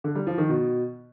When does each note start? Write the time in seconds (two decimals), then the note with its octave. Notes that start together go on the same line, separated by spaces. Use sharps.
0.04 D3
0.15 G3
0.27 F3
0.38 D#3
0.49 B2